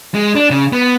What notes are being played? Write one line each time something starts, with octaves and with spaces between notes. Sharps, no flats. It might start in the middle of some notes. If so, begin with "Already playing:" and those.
G#3
D4
C#3
B3